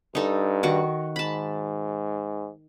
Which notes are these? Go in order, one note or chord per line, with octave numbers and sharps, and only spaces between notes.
G2 D#4 A4
D#3 F#4
G#2 A5 B5